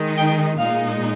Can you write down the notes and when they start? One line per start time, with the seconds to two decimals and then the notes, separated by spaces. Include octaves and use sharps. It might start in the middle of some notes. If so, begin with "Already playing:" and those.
Already playing: D#3 G#3 D#4
0.17 G5
0.57 A#2 G#3 D#4 F5